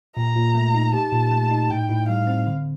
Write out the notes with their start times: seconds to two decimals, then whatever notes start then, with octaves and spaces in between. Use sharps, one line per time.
0.16 A#2 A#5
0.36 A#2
0.55 A3
0.74 D#4
0.93 G4 A5
1.12 A#2
1.31 A3
1.51 D#4
1.70 A2 G5
1.89 A2
2.08 G3 F5
2.27 C4
2.47 D3